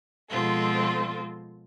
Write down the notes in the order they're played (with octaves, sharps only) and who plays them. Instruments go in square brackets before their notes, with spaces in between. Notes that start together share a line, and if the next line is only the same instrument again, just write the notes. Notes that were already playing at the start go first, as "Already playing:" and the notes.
[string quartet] B2 F3 G#3 C4 F4 A4